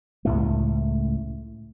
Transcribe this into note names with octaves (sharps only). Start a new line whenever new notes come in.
C#2 A2 A3